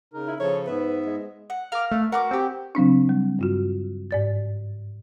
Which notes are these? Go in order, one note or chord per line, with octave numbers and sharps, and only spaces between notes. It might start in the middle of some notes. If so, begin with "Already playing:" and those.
C#3 D#4 A#4
E4
C#3 F3 A4 C#5
G#2 B3 B4 E5
G#3
F#5
A#4 F5 D6 F6
A3
F#4 A#4 B4 D6
C4 G4
C#3 F#3 C4 D4
G3
G2 F4 F#4
G#2 D5 A6